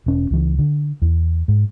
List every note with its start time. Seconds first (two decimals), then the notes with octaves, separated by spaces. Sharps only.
0.06 E1 C#4
0.31 C#2 E3
0.58 D3
1.02 E2
1.48 G#2